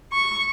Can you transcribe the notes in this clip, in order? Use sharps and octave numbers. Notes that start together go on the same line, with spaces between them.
C#6